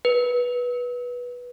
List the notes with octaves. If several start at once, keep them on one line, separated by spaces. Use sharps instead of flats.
B4